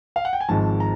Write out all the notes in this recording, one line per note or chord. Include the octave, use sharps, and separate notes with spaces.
F5
F#5
G5
G#5
G#1 G#2 F3 A5
A#5